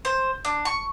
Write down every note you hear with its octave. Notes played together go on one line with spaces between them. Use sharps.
C5
D4
C#6